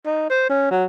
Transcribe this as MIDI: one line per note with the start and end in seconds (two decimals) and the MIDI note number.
0.06 0.29 63
0.29 0.47 72
0.49 0.67 61
0.71 0.84 54